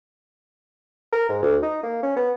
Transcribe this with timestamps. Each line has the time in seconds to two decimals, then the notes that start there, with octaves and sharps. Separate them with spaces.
1.13 A#4
1.29 G#2
1.43 D2
1.63 D#4
1.83 A#3
2.03 C#4
2.17 B3